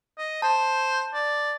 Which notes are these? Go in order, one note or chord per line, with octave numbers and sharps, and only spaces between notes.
D#5
C5 A5
D5